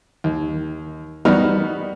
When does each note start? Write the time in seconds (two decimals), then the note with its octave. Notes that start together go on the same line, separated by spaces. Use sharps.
0.24 D#2
1.25 G3 B3 D#4 F#4 F6